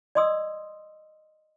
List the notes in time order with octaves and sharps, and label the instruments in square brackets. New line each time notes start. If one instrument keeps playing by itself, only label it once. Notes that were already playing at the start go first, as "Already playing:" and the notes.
[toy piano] D5 D#5 C6 D#6 E6